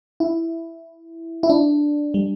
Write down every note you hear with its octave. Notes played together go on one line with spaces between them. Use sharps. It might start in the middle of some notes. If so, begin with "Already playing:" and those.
E4
E4
D4
G3